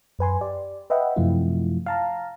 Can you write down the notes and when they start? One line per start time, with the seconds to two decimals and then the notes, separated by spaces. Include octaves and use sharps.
0.19 F#2 B4 G#5 C6
0.41 G4 D5
0.90 B4 D#5 E5 F#5 G5 B5
1.16 F#2 C3 F3 A3 E4 F4
1.86 F5 A5 A#5